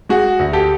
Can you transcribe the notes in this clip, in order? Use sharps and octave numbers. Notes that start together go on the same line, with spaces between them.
G#3 F#4 G#4
D2
G4 A4